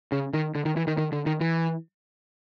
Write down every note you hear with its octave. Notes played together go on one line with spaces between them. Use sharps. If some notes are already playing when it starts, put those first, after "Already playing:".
C#3
D#3
D3
D#3
E3
D#3
D#3
D3
D#3
E3